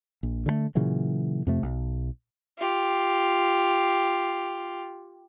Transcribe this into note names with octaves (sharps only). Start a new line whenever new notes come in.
A#1
D3 E3 A3
A#2 C#3 E3 F#3
F2 C3 A3
B1
F4 G4